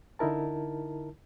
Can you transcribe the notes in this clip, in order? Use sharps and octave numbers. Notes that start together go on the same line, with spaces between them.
D3 D#4 E4 A#4 A5